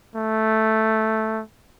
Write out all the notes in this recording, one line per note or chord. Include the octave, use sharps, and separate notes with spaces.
A3